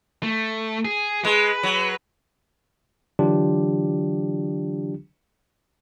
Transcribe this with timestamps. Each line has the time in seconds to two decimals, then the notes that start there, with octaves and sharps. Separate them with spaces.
0.23 A3
0.85 G#4
1.25 G#3 B4
1.63 F#3
3.19 D3 E3 F#3 D4 F4 G4